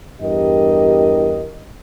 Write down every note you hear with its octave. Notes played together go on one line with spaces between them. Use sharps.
E2 G2 G4 A#4 D#5